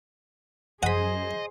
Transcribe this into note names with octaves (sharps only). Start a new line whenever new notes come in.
F#2 G#4 C5 D#5 F#5 B5